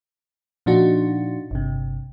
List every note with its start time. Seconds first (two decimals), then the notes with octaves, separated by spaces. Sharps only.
0.66 A#2 F3 D4 D#4 F#4
1.51 G1 C3